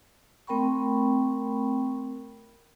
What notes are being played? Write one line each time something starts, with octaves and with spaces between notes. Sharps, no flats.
A3 C4 A#4 G5 B5 C#6